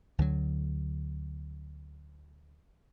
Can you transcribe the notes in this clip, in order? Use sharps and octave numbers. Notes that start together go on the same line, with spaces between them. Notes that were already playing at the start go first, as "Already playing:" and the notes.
D2 D3 F#3